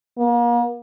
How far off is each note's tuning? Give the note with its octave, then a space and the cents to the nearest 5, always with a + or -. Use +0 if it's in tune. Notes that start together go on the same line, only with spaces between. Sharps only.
A#3 +40